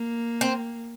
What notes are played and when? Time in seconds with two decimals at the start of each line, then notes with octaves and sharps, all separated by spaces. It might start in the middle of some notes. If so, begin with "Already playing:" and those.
Already playing: A#3
0.41 C4